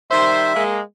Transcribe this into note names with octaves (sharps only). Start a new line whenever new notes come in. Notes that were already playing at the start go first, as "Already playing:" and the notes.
D#3 G3 C5 E5
G#3 A#3